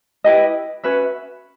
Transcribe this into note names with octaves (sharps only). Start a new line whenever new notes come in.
E4 G4 B4 D#5
C#4 F#4 B4 E5